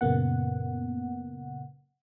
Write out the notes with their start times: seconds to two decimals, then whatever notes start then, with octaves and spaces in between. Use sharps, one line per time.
0.01 F#2 A#2 C#3 A#3 B3 F#5